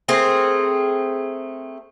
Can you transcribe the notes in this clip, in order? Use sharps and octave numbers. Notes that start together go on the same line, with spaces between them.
A3 C4 G#4 A#4